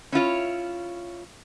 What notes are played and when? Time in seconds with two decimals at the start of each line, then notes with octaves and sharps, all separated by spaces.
0.12 C#4 E4 F4 C#5